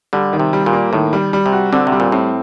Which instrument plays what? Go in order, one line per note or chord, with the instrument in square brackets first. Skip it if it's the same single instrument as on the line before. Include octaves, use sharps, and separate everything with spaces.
[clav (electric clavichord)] D3 [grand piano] G3
[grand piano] D#3
[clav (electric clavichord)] C3
[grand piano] G3
[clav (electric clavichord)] A#2
[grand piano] A#3
[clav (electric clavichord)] A2 [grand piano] D#3
[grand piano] G3
G3
[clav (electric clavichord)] C3
[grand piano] F#4
[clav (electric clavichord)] D3 [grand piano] C4
[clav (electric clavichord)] C3
[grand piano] G3
[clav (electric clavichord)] A#2
[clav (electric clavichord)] A2 [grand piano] C4